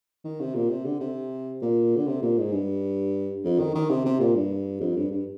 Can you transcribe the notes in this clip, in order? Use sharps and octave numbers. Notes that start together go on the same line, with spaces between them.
D#3
C3
A#2
C3
D3
C3
A#2
D3
C3
A#2
G#2
G2
F2
D#3
D#3
C3
C3
A#2
G2
F2
G2
G2